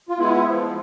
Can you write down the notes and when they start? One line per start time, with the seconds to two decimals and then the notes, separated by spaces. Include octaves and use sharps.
0.09 F4
0.18 G#3 B3 E4
0.46 F3